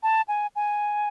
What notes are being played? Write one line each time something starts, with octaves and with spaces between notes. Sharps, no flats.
A5
G#5
G#5